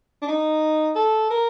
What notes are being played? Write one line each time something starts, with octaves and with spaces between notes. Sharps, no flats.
D4
D#4
A4
A#4